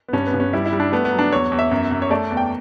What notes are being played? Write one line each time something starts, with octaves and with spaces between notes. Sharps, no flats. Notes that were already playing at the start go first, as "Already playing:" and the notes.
B3
G2 C#4
B3
G2
C#4
G3 E4
E4
G3
D4
A3 B3
B3
F#3
D4
E2 C#5
E2
E5
F#2
F#2
C#5
A3 D5
E2
G5